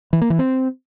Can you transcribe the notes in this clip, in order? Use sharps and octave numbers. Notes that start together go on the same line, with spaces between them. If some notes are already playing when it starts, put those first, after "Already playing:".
E3
A#3
E3
C4